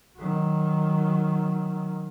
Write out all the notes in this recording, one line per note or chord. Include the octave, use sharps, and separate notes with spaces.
D#3 F#3